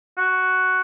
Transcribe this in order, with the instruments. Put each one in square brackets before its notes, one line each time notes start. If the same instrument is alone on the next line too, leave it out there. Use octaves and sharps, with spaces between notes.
[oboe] F#4